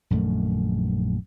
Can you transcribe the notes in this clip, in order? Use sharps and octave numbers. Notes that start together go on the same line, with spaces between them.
A#1 F#2 D#3 A3